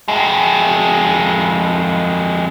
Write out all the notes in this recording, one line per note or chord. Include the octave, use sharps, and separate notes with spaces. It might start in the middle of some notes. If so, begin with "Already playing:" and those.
F2 G#3